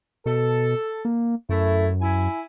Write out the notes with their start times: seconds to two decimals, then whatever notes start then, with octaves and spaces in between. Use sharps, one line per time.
0.26 B2 A4
1.05 A#3
1.49 F#2 A3 E4
2.00 E4 G#5